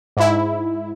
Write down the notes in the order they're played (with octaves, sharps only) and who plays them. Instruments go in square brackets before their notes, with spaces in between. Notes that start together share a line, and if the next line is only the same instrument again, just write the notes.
[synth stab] G#2 E4